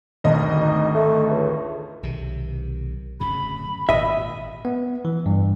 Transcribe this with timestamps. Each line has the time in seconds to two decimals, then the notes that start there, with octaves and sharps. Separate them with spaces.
0.24 G#1 D2 D#5
0.62 D#4
0.94 A3
1.30 C#2
2.03 B1 C3 D#3
3.20 D1 F#2 C#3 B5
3.89 G#1 A#2 D#5 E5
4.65 B3
5.05 E3
5.26 G2